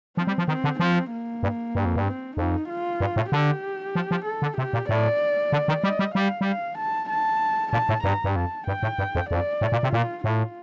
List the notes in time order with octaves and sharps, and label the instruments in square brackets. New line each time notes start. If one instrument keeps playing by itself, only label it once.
[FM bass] F3 [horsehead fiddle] C4
[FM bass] G3
F3
[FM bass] D#3 [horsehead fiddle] C4
[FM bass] D3
[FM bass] F3 [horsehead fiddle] C4
[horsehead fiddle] A#3
[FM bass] G2
G2
F2
G2
[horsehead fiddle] C4
[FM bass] F2 [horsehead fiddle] D#4
[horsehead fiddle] F4
[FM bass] G2
A2
[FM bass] D3 [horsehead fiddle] G4
[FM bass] F3
F3
[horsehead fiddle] A4
[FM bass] D3
[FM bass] C3 [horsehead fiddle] G4
[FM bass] A#2
[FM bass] A2 [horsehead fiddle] D5
[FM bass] D3
D#3
[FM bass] G3 [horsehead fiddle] D#5
[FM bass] G3
[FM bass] G3 [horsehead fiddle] F5
[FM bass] G3
[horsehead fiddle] F5
A5
A5
[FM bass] A#2 [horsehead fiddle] A5
[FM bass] A2
[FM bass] G2 [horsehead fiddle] A#5
[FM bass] G2
[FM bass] F2 [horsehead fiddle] A5
[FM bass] G2 [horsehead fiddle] G5
[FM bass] A2
G2
F2
[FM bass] F2 [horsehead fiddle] D5
[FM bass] A2
A#2
C3
[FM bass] A#2 [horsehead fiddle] F4
[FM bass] A2 [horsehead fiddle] F4